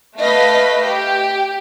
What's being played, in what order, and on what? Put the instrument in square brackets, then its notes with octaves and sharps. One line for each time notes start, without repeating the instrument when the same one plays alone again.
[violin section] A3 B4 D#5 F5 B6
G4